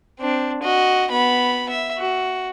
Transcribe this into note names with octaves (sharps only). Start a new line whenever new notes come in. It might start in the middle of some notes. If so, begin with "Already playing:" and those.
C4 D4
F#4 D#5
B3 B5
E5
F#4